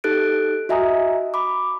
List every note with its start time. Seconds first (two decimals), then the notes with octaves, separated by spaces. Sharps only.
0.04 D#4 G4 A4 F#6 A6 D7
0.69 F#4 D#5 E5 G#5 A#5 D#6
1.34 B5 D6